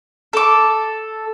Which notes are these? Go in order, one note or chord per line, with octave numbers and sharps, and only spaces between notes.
A4 D6